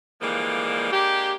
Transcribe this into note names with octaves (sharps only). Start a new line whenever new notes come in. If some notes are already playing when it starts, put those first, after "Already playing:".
D3 E3 F3 G3 G#3 A#3
G#3 A#3 D4 G4